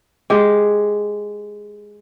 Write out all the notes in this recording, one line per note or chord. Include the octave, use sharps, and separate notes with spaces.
G#3 G4 G#4